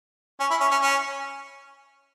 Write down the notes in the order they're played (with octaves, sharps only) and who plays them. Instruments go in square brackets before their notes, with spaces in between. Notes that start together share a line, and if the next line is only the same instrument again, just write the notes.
[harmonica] C#4
E4
C#4
C#4
C#4